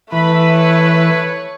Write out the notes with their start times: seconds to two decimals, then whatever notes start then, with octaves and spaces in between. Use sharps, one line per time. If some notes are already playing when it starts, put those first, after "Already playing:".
0.12 E3 A3 B4 B5
0.51 C#5